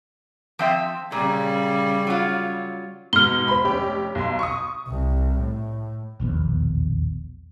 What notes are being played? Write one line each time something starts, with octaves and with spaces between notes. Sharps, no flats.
F3 C4 E5
A#2 C#3 G3
F#3 F4
G#2 B2 F6 G7
C5 B5
F1 C#4 G4
B1 C6
C#6 D#6
C2
A2
E1 A#1 D#2 B3